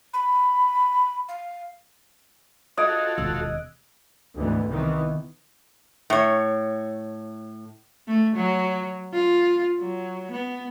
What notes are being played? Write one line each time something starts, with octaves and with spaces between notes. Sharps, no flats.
B5
F5
F4 F#4 A4 D#5 F#6 G#6 D7
E1 D#2 E6
D2 G#2 E3 B3
C2 D#3 E3 B3
A2 C#5
A3
F#3
F4
F#3
B3